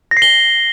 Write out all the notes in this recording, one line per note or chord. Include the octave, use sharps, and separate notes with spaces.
A#6
C7
G7